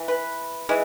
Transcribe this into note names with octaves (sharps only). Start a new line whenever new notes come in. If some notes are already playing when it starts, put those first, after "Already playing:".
Already playing: E3
B4
E3 G#3